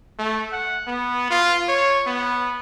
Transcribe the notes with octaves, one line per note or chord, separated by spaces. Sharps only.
A3
F#5
B3
F4
C#5
B3